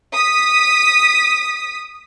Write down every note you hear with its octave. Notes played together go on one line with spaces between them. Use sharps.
D#6 B6